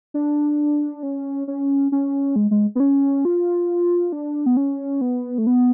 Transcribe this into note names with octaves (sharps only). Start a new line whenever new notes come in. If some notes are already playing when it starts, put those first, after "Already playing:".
D4
C#4
C#4
C#4
G#3
G#3
B3
C#4
F4
D4
B3
C#4
B3
A3
B3